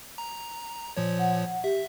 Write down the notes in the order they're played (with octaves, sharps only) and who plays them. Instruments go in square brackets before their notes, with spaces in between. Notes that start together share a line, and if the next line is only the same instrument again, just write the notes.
[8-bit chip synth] A#5
A#2 F3 C#5
[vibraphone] F#5
[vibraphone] G4 [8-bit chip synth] E5